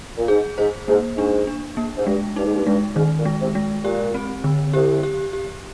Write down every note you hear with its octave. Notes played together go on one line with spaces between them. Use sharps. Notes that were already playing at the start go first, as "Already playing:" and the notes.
A#2
G#2 G#4
G#2 C5
G#2 A#3
G#2 D4
D4
A#3
G#2
G2 G#3
G2 D#4
G#2
G2
G2 G#3
G#2 D#3
A#2
G#3
C2 C3
G#3
A#2 G4
C4
D3
C2 C3 G4
G4
G4